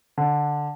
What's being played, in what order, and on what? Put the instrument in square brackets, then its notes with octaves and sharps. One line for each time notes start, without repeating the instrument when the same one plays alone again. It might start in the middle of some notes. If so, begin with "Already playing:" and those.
[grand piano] D3